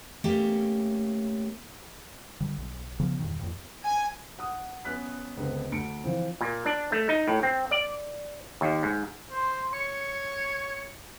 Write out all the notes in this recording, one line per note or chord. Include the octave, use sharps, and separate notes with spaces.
A3 A#3 C#4 G4 E5
D3 G3
B1
C#3 F3 B3
E2 G2 A#2 D#3
E2 A2
G#5
F#5 D#6
B3 C#4 E5 F#6 B6
C#2 D3 B3 C4
D2 C#7 D7
E3 F3 C4
A#2
D4
A3
D#4
A2
C4
D5
D#2
G#2
C5 C6
C#5 C#7